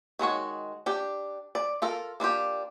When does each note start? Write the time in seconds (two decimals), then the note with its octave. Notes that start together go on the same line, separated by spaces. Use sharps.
0.19 D#3 G#3 F#4 C#5
0.86 D4 G4
1.55 D5
1.82 F4 A4 A#4
2.20 A#3 D4 F4 G4